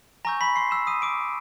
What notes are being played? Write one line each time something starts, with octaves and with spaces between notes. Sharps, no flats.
G#5 A#5 C#6 E6 G6 A#6
B5 B6
C6 C7
E6 E7
D#6 D#7
D6 D7